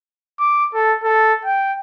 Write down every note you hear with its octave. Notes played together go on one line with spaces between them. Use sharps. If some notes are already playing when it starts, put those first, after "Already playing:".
D6
A4
A4
G5